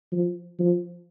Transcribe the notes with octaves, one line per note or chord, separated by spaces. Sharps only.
F3
F3